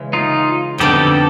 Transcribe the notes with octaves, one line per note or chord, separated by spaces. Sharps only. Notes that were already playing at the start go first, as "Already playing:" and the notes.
Already playing: C#3 E3 G#3 C#4
D#4 F4
F2 D3 G3 B3 D#4 G4 A4
A4